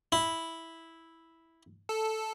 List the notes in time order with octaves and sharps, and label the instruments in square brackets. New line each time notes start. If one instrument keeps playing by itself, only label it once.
[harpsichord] E4
[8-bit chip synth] A4